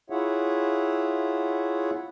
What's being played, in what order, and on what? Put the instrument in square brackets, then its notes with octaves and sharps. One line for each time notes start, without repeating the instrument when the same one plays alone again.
[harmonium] E4 F4 G#4 C#5 E5 F#5